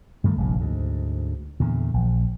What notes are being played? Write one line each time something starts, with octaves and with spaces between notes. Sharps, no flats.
G2 D#3 A3
F1 A#1 E2 G2
D2 G#2
E2 A#2 D3
A#1